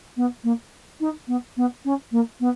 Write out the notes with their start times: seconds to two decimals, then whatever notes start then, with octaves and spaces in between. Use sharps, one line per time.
0.16 B3
0.44 A#3
1.00 D#4
1.27 B3
1.57 B3
1.85 C#4
2.11 A#3
2.40 B3